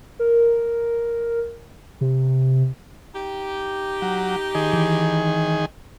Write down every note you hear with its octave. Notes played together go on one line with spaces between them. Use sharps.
A#4
C3
D#4 G4
F#3
D#3 G#4
E3